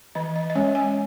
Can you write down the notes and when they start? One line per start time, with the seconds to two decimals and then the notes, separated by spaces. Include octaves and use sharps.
0.15 E3 D#5
0.36 D#5
0.50 D#5
0.55 G#3 C#4 C#5
0.75 G#5